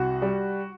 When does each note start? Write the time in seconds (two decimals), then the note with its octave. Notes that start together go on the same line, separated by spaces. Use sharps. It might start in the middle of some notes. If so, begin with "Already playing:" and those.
Already playing: C2 F#4
0.22 G3